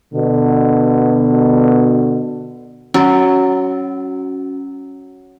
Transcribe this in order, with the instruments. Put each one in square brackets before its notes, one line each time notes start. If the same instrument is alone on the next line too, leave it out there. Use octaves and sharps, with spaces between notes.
[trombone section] B2 D3
[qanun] F#3 [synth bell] C#4 F#4